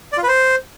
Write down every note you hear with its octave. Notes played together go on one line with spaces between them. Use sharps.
D5
F4
B4
C5